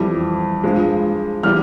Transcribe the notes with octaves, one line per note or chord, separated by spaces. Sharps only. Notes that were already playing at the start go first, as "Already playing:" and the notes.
Already playing: F2 E3 G3
G2 F3 G#3
E3 G3 F6